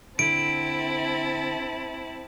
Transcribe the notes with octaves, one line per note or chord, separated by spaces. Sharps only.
D3 C4 E4 A5 D7